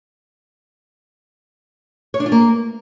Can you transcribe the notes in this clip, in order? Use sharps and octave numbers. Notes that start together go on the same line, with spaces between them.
C#5
D4
F4
A#3